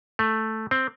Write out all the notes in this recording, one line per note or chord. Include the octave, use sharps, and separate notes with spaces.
A3
C4